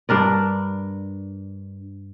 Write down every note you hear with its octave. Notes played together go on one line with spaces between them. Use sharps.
G2 D4 A#4 D5